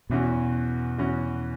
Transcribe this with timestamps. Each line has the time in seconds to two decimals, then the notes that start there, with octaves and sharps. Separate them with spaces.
0.10 E2 B2 E3 C#4 F#4
0.98 E2 E3 C#4 F#4